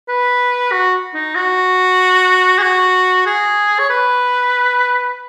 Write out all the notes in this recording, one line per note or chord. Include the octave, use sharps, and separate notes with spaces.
B4
F#4
D#4
F#4
G#4
F#4
G#4
C#5
B4